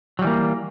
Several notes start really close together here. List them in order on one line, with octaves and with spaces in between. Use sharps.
F#3 G3 E3 A#3